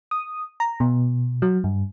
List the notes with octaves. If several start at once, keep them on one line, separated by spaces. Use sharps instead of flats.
D#6
A#5
B2
F#3
G2